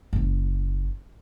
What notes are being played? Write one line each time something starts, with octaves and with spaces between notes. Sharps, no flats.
F#1 E4